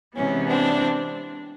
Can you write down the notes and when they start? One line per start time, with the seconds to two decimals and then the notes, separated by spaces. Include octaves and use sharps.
0.15 C3 E3 G#3 B3 C#4
0.49 C4 D4